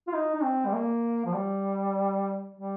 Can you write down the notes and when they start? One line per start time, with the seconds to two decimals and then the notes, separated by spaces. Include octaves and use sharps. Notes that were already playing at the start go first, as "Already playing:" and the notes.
0.07 F4
0.13 D#4
0.35 D#4
0.43 C4
0.66 G3
0.73 A#3
1.25 F3
1.34 G3
2.56 G3